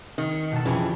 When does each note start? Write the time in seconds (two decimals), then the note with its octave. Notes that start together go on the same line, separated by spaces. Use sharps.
0.18 D#3
0.31 C#7
0.52 B2 D#4 A4
0.65 F2 C#3 E3 G4 D7